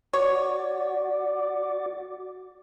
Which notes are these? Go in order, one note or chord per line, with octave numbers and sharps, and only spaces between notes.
F#4 C#5 D5